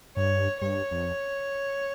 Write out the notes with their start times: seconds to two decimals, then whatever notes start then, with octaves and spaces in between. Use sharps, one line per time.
0.17 G2 C#5
0.61 G2 C#5
0.91 F2